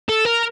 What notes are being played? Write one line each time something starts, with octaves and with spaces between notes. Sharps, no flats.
A4
A#4